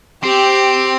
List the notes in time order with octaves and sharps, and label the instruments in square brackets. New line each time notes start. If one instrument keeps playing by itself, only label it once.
[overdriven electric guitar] C4 [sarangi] G4